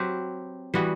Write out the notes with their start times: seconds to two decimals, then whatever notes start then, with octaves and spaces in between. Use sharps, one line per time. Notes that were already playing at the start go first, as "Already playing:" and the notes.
Already playing: F#3 C4 G4 B4
0.74 E3 G3 B3 F#4